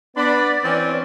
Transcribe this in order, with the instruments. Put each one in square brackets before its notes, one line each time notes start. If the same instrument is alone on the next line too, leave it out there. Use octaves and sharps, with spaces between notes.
[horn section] B3 D4 B5 [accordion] D5
[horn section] E3 C4 C#4